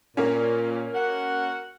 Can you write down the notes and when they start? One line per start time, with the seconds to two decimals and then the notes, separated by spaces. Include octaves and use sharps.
0.17 A#2 A#3 C#4
0.94 F#4 A#4 F#5